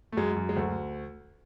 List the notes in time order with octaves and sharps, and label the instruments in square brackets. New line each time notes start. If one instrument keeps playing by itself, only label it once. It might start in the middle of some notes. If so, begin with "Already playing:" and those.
[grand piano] A3
F#2 G#3
F#2
G#3
D2 A3